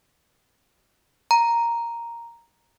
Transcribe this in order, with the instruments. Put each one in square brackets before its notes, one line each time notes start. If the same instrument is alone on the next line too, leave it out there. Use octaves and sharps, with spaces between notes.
[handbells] A#5